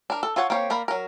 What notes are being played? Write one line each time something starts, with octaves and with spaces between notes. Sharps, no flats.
D4 A#4
A4
F4 A4 C#5 F#5
A#3 C4 G4 C#5
A#3 A#4 D5 B5
F#3 A#4